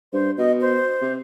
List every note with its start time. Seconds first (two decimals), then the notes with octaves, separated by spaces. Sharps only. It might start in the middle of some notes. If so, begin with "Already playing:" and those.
0.13 G2 C5
0.38 B2 D#5
0.61 C5
1.02 C3